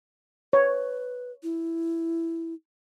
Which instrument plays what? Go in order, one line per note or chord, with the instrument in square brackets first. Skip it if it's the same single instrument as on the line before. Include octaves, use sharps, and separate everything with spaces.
[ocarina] B4 [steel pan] C#5
[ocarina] E4